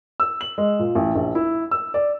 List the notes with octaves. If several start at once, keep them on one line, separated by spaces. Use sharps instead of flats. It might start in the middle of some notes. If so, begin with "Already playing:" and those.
E6
F#7
G#3
A#2
A1
A#1
E4
E6
D5